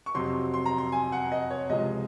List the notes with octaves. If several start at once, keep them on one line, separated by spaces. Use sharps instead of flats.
C#6
F2 C3 F#3 C4 C6
C6
A#5
C6
G#5
F#5
D#5
C#5
C#2 C3 F3 G#3 D#5